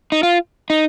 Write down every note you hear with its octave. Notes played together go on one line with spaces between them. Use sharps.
D#4
F4
D#4